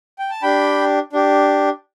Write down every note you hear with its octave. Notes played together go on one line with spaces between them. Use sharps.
G5
A5
D4 G4 G5 B5
D4 G4